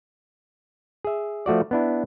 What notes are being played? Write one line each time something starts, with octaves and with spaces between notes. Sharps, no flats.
G#4 E5
F3 A3 F#4 D5
B3 D4 E4